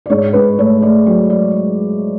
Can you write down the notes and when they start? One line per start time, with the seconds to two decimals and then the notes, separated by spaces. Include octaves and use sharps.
0.06 D5
0.10 G#2 C#5
0.33 G#2 B4
0.59 A3 C#5
0.82 A3 D5
1.06 F#3 D5
1.30 D5